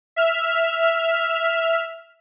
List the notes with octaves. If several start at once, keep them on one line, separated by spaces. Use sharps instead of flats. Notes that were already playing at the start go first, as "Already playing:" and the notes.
E5 F6